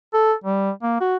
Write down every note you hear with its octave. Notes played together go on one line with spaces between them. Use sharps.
A4
G3
A#3
F#4